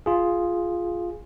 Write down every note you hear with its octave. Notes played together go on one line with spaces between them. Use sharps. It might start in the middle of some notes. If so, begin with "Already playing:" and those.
F4 G#4